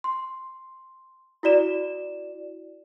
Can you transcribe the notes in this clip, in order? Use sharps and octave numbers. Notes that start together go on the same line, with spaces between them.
C6
E4 F#4 D5 E7